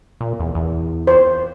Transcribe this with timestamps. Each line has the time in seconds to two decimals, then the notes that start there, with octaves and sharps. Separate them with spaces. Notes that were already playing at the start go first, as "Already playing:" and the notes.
0.21 A#2
0.40 E2
0.55 E2
1.07 C5